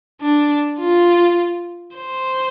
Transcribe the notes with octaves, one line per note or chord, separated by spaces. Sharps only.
D4
F4
C5